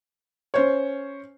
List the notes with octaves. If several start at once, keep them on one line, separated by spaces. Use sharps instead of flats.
C#4 C5 C#5